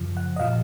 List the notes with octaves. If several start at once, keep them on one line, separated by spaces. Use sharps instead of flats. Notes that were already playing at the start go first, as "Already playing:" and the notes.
Already playing: F#2 C#3 F3
F#5
D#5
A#2 F3 F5